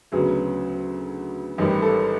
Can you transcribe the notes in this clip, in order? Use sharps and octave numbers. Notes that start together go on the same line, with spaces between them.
D2 C#3 F#3 B3 G#4
A1 G#2 D#3 G3
A4